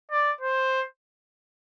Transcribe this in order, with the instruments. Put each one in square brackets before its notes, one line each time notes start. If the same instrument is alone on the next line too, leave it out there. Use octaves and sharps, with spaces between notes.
[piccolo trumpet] D5
C5